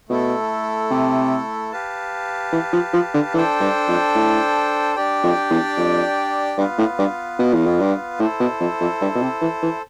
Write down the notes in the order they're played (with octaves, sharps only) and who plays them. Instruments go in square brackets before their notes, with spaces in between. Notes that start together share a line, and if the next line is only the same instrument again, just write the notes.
[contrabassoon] B2 [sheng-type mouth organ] A3 E4 A4
[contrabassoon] C3
[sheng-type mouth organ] G4 B4 F5 A5
[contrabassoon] E3
F3
F3
D3
[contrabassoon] E3 [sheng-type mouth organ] D4 A4 C5 G5
[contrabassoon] G2
F2
A2
[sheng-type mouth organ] D4 G4 D5 G5
[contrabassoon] F2
E2
F2
[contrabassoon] G2 [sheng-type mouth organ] B3 F4 B4 F5
[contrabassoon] A2
G2
B2
E2
F2
G2
[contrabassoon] A2 [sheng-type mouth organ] E4 A4 C5
[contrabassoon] B2
F2
F2
G2
B2
C3
E3
E3